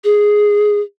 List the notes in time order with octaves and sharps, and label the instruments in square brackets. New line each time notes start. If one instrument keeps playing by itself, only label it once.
[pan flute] G#4